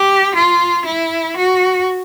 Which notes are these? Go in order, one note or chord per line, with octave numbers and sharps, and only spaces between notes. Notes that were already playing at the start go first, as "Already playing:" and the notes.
Already playing: G4
F4
E4
F#4